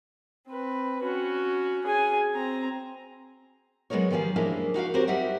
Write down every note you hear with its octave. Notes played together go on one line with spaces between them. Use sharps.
C4 B4
C#4 F#4
G#4 G#5
C4 A#5
F#3 G#3 B3 D#4 A#4 C#5
D#3 F3 G3 G#4 F5
F3 G#3 A#3 C#4 D4 E4
D#4 F#4 A#4 F5
C4 F#4 G4 A#4 C5 C#5
G3 D#4 E5 F#5